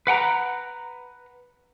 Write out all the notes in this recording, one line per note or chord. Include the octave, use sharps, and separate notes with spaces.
B4 F#5 G5 A#5